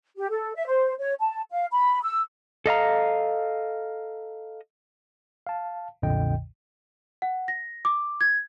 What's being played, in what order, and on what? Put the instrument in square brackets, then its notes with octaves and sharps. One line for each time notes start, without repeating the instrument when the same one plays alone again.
[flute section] G4
A4
E5
C5
C#5
A5
F5
B5
E6
[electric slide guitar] A4 D#5 F5 A#5
[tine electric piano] F5 A5
B1 F2 A#2 D3 D#5 G5
[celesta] F#5
A#6
D6
G#6